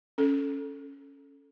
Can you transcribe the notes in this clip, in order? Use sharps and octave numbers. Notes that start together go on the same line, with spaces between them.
C#4 A4